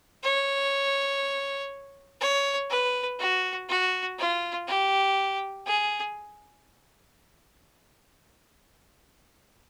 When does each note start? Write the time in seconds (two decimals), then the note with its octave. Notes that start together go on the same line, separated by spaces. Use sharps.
0.23 C#5
2.21 C#5
2.70 B4
3.19 F#4
3.69 F#4
4.19 F4
4.68 G4
5.66 G#4